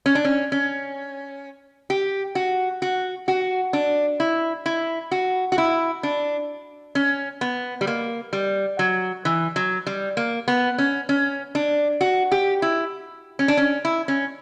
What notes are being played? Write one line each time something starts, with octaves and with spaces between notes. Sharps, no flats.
C#4
D4
C#4
C#4
G4
F#4
F#4
F#4
D4
E4
E4
F#4
F#4
E4
D4
C#4
B3
G3
A#3
G3
F#3
E3
F#3
G3
A#3
B3
C#4
C#4
D4
F#4
G4
E4
C#4
D4
C#4
E4
C#4